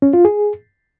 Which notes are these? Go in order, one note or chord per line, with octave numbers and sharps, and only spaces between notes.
C#4
F4
G#4